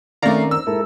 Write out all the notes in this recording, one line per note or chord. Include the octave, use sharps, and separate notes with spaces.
D#3 A3 C4 C#4 D5 F5 A#5
E6
G#2 E4 A4 A#4